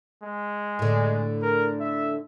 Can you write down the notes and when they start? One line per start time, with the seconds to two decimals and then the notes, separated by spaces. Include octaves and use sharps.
0.23 G#3
0.79 A2 D3
1.42 A#4
1.80 E5